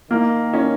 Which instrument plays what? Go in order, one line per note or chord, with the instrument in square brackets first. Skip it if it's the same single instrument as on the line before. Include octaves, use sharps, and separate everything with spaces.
[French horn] D#3 [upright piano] A#3
[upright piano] C#4